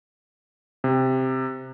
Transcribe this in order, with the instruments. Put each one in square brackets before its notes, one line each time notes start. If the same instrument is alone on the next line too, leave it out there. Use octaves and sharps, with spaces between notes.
[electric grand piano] C3